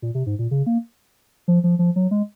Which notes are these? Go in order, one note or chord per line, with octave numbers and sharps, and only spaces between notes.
A#2
C3
G#2
A#2
C#3
A#3
F3
F3
F3
F#3
G#3